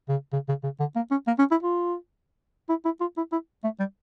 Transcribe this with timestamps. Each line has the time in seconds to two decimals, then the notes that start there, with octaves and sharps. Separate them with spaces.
0.09 C#3
0.33 C#3
0.49 C#3
0.64 C#3
0.80 D3
0.96 A#3
1.11 C#4
1.28 A#3
1.39 C#4
1.51 E4
1.63 F4
2.69 E4
2.85 E4
3.01 F4
3.17 E4
3.32 E4
3.64 A3
3.80 G3